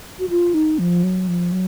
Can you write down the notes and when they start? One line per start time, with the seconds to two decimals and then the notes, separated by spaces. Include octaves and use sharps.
0.19 F#4
0.29 F4
0.54 D#4
0.79 F3
1.03 F#3
1.28 F3
1.52 F#3